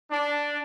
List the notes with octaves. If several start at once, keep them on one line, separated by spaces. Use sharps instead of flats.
D4